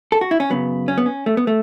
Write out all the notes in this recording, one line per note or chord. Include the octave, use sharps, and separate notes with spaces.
A4
F#4
E4
C#4
F#2 C#3 F#3 B3
C#4
B3
C#4
A3
B3
A3